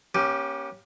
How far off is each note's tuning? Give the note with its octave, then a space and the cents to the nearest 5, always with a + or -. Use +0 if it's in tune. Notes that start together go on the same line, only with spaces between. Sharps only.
A#3 +45 C#4 +0 G4 +0